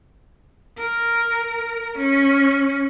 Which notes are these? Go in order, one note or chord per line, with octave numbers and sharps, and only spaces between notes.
A#4
C#4